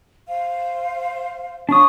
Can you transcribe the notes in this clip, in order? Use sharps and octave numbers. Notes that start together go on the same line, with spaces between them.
C5 F5
D4 F4 C#5 C#6 D#6